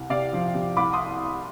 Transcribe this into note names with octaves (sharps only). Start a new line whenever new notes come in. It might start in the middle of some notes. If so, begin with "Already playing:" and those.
Already playing: C2
C3 D5 F5
F3
C3
C2 B5 D6
C6 D#6